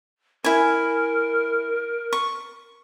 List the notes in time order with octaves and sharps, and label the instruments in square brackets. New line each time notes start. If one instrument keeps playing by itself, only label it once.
[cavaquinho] E4 G#5 [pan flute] A#4
[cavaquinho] C#6